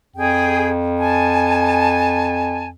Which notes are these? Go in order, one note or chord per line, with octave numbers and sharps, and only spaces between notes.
F2 G#4 G5
G#5 A5